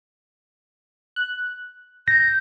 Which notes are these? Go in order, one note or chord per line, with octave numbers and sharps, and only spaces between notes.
F#6
G6 A#6